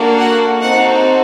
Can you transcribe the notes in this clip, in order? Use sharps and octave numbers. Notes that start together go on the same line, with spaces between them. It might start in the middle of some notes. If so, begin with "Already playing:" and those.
Already playing: A#3 D4 F#4 A4
F#5
C4 D#4 F#4 A4 F#5